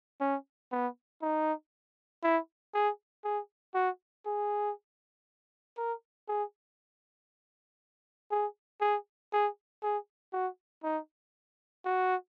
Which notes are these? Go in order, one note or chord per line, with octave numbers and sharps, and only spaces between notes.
C#4
B3
D#4
E4
G#4
G#4
F#4
G#4
A#4
G#4
G#4
G#4
G#4
G#4
F#4
D#4
F#4